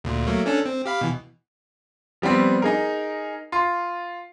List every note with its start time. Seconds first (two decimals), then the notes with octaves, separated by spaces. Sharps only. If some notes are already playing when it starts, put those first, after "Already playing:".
0.04 D2 A#2
0.27 F#3 A3 A#3
0.46 C#4 D4 A4
0.66 C4
0.86 G4 F5 B5
1.01 B2 E3
2.22 F3 G3 B3 C4
2.62 D#4 G#4 A#4
3.52 F4 C6